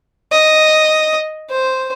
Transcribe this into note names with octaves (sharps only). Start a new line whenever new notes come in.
D#5
C5